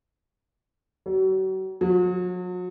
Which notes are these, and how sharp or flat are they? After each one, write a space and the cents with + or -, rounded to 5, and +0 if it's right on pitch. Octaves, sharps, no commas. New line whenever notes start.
F#3 +40
F#3 -40